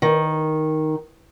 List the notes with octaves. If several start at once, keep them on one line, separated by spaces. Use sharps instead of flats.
D#3